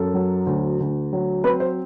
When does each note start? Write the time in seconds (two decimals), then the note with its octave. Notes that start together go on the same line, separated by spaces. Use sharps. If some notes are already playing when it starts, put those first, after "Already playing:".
Already playing: F#2 A4
0.14 F#3
0.47 D2
0.80 D2
1.13 F#3
1.44 C4 B4
1.60 C5